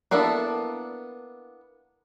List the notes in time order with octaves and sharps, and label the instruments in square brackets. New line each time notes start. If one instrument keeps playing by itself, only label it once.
[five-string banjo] A#3 B3 D4 E4 A4